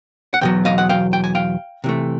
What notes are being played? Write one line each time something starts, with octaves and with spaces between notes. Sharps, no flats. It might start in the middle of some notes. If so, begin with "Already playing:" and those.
F#5
E2 B2 F#3 G5
D#5 F5
F#5
F5 G5
G5
G#5
F5 G5
C3 E3 A3